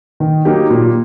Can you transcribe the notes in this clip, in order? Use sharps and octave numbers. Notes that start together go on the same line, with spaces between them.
D#3
F#3 A#3 D#4 G4
A#2